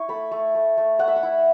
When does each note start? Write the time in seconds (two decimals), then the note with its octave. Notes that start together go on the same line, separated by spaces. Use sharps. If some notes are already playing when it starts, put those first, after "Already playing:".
Already playing: E4 C#6
0.09 A3 B5
0.31 A3
0.55 A3
0.78 A3
0.99 A3 F#5
1.08 E5
1.16 F#5
1.23 E4